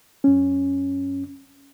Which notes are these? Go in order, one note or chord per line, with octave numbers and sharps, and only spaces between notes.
F#2 C#4